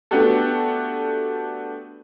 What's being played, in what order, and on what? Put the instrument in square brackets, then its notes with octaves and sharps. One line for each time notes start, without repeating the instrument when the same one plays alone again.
[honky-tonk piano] A3 B3 D4 F#4 G4 A4